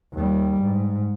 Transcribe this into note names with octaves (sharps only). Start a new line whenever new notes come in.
D#2 G3
G#2